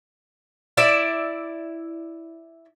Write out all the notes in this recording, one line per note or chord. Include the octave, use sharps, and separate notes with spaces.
E4 D5 E5